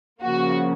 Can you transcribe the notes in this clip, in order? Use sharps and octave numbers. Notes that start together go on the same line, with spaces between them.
C#3 F3 A#3 F#4